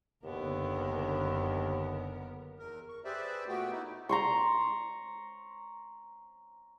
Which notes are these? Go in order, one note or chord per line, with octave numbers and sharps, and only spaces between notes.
F#1 D#2 D3 B3 A#4
E2 A#4
C#6
G4 G#4 B4 C5 D5 E5
A#2 A3 B3 F#4 G4 G5
A3 D#4 E4
A#5 C6 C#6